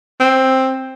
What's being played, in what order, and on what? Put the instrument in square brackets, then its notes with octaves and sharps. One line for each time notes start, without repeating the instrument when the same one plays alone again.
[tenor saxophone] C4